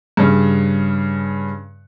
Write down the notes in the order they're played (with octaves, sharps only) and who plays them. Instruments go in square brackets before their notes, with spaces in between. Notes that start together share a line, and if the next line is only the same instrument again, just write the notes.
[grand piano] G2 C#3